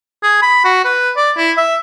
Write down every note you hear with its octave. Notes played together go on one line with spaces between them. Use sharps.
G#4
B5
F#4
B4
D5
E4
E5